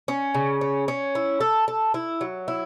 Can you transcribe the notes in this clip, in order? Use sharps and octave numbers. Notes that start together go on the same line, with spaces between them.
C#4
C#3
C#4
C#4
E4
A4
A4
E4
F#3
E4